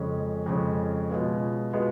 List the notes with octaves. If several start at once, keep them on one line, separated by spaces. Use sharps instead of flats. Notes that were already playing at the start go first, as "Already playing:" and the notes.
Already playing: F2 C#3 G#3 C#4
F2 C#3 G#3 C#4
B2 G#3 B3 F4
B2 G#3 B3 F4